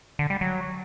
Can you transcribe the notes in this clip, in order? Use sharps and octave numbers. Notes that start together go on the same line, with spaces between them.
D3
G3
F#3